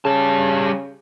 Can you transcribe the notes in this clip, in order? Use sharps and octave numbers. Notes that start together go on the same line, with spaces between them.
C#3 G3 A5